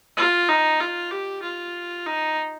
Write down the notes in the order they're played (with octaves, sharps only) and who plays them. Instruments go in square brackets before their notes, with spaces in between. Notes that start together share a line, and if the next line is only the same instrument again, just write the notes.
[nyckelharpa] F4
D#4
F4
G4
F4
D#4